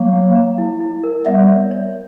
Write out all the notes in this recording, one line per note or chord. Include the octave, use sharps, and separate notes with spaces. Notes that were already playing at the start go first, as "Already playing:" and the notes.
Already playing: F#3 A#3 C#6
F#5
A#5
E4
E4
A#4
G3 B3 E5
C#5
C#5